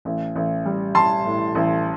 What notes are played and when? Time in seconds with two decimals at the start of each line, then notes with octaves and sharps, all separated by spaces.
0.05 A1
0.36 A1
0.65 G3
0.95 G3 A5 C6
1.25 A2
1.55 A1